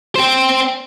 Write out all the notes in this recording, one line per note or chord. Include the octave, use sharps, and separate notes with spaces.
C5 G5